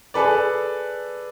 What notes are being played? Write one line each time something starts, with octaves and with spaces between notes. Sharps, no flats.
G#4 A4 B4 D5